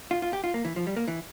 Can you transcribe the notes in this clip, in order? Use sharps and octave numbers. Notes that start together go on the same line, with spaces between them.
F4
F4
G4
F4
A#3
E3
F3
G3
A#3
E3